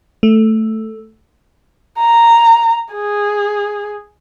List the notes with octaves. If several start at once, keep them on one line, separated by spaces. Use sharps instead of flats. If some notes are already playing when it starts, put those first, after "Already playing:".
A3
A#5
G#4